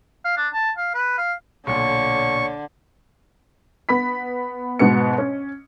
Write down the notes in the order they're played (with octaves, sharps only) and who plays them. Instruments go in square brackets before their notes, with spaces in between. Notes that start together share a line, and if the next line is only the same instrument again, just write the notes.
[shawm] F5
D4
A5
F5
B4
F5
[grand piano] B1 A#2 [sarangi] D3 [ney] C#5 [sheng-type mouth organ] C#6
[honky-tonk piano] B3 B5 B6
G#2 B2 B3 C#7
C#4